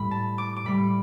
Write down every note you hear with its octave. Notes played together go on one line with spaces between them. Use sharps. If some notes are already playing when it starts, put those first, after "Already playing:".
Already playing: A2 G3 B5
A5
D6
D6
A2 G3 B5